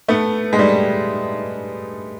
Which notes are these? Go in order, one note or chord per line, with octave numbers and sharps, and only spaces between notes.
A3 B3
G#3
G3 A3